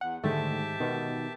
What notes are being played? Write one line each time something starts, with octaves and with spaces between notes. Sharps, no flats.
E2 F#5
G#2 D3 D#3 G#3 A3 G4 E5 A5
B2 D#3 B3